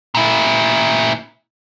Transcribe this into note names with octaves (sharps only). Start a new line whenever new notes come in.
A#2 E4